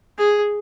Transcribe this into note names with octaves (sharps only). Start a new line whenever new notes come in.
G#4